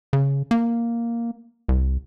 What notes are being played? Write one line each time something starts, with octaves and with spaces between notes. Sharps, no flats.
C#3
A#3
C2